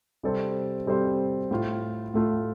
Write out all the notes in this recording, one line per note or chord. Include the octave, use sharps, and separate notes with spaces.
C3 G3 C4 A4 C5
C3 G3 C4 A4 C5
A2 A3 F4
A2 A3 F4